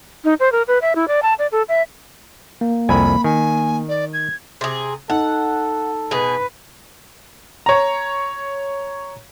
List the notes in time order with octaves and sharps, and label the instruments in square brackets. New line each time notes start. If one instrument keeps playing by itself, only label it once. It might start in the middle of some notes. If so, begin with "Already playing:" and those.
[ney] D#4
C5
A#4
B4
E5
E4
D5
A5
D5
A4
E5
[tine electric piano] A#3
[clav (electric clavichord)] C2 F2 G#5 [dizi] B5
[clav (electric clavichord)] D#3 [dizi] G#5
[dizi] D5
G#6
[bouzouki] C3 G#4
[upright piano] D#4 [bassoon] A4 [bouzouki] F#5
[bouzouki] B2 G#4 [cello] B4
[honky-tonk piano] C#5 A#5